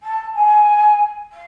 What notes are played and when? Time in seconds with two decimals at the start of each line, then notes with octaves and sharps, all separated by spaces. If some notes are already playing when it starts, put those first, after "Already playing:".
0.03 A5
0.34 G#5
1.32 F5